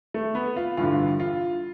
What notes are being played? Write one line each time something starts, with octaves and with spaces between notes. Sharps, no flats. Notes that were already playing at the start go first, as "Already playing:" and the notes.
A3
B3
F4
A1 G2 D3 F4
F4